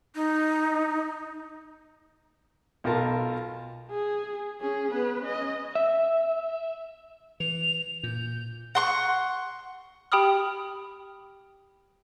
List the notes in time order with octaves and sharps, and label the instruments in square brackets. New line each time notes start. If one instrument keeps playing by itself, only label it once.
[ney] D#4
[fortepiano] B1 F4 A#4 A5
[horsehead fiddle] G#4
C#4 G#4
B3 B4
C#4 D#5
[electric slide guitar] E5
[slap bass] E3 [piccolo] F7
[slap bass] A#2 [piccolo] G6
[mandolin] F#5 C6 C#6
[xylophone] G4 G5 B5 D#6 F6